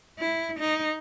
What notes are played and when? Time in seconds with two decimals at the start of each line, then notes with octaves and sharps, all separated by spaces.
0.19 E4
0.59 D#4